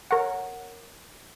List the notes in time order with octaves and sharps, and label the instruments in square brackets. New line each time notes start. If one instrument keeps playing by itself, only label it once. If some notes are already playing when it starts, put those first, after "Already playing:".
[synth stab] A#4 C#5 F#5